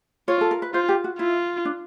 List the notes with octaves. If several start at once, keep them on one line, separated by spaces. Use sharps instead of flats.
F4 C#5
A4
A#4
B4
F4 C5
G4
F#4
E4 F4
D4